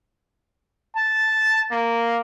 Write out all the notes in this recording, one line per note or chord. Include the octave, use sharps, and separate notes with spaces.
A5
A#3